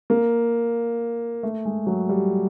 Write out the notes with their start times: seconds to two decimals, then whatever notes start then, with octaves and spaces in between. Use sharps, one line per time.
0.10 A#3
1.43 A3
1.65 G#3
1.87 F#3
2.09 G3